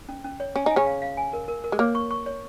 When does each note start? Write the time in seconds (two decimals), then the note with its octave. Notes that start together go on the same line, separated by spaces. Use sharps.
0.09 C#4
0.25 C#4
0.40 C#5
0.56 C#4 G#5
0.66 D#4 G#5
0.76 C#3 C#4
0.86 F5
1.02 F5
1.17 G#5
1.33 A#4
1.48 A#4
1.64 A#4
1.72 G#3
1.79 A#3 C#5
1.95 C#6
2.11 C#6
2.26 C#5